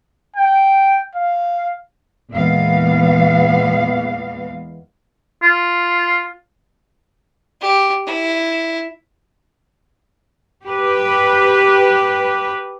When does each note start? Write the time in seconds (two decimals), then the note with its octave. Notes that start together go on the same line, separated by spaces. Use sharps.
0.36 G5
1.15 F5
2.31 E2 A#2 E3 G#3 B3 F5
5.43 F4
7.61 G4
8.07 E4
10.66 G4 B4